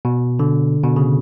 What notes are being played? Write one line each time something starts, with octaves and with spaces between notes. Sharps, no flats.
B2
D3
B2
C#3